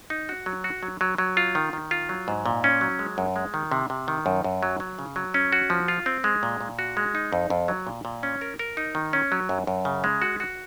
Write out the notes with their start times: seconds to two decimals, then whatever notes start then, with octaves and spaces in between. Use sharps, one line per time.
0.10 D#4
0.29 F#4
0.46 F#3
0.64 F#4
0.83 F#3
1.01 F#3
1.18 F#3
1.37 F4
1.55 D#3
1.73 D#3
1.91 F4
2.09 F#3
2.28 G#2
2.46 A#2
2.64 C#4
2.81 F#3
2.99 G#3
3.18 F#2
3.36 G#3
3.54 D#3
3.72 C3
3.90 C3
4.08 D#3
4.26 F#2
4.44 F#2
4.63 F#3
4.80 F#3
4.99 C#3
5.16 F#3
5.34 C#4
5.52 F#4
5.70 F3
5.88 F4
6.06 C4
6.24 G#3
6.43 A#2
6.61 A#2
6.79 F#4
6.97 G#3
7.15 D#4
7.33 F2
7.50 F2
7.68 F#3
7.87 A#2
8.05 A#2
8.23 C#4
8.41 A#4
8.59 A#4
8.77 D#4
8.95 D#3
9.13 C#4
9.32 F#3
9.49 F#2
9.67 F#2
9.85 C#3
10.04 G#3
10.22 F#4
10.40 F#4